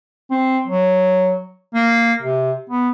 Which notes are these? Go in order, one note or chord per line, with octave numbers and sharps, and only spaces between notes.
C4
F#3
A#3
C3
B3